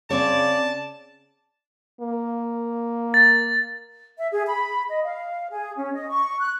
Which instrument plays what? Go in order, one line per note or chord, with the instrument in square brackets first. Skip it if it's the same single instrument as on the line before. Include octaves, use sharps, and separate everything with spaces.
[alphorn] C#3 [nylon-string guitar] C4 C#5 [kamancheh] D5 [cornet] A5
[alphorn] A#3
[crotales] A6
[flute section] E5
G#4
B5
D#5
F5
G#4
C#4
D#5
C#6
F#6